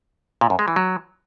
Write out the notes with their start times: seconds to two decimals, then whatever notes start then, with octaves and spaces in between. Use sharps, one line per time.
0.41 A#2
0.50 F#2
0.59 G#3
0.68 E3
0.76 F#3